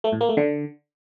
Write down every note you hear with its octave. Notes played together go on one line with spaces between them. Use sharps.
A3
A2
A#3
A3
D3